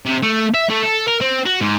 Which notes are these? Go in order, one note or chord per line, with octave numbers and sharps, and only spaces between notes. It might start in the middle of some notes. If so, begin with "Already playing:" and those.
C3
A3
E5
A3
A4
A#4
C4
F#4
G#2